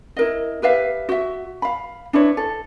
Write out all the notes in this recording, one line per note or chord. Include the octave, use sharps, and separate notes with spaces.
E4 A#4 D#5
G4 B4 E5 F5
F#4 E5
F5 B5
D4 E4 B4 C#5
A4